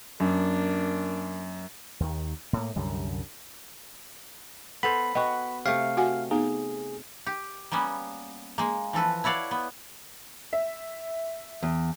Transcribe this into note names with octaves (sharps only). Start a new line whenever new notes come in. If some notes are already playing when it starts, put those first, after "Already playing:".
F#2 A#3 D4
D#2 D#3
A2 A#3
C2 F#2 D3 G3
B3 A4 C5 B5
B3 F#4 D#5 G5
C3 A3 F5
F#4 F#5 G#5
B3 D#4 G#4
G4
G3 A#3 B3 C#4
G#3 A#3
E3 F3 A4 B4
E4 F#4 C#5 D5 F5
B3
E5
E2